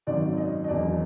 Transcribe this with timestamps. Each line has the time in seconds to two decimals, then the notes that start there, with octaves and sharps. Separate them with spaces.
0.07 G#1 F#2 D#3 F#3 D5
0.38 D#5
0.64 D#5
0.68 E1 E2 B2 F#3 D5